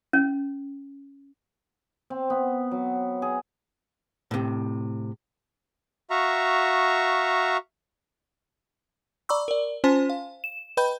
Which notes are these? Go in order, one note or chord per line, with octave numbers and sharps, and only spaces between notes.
C#4
C4
B3
F#3
G#4
A2 C3
F#4 E5 F5 A#5 C#6
D5 A#5 B5 C#6 D6 E6
A#4 D5
C#4 F4 C5 G#5 A5 C6
F5
E7
B4 D#5 G5 B5 G6